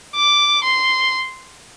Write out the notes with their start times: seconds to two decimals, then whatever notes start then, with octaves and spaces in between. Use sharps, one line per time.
0.16 D6
0.64 C6